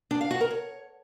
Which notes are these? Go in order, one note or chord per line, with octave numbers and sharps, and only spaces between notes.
D4
F5
F#4
A#4
C#5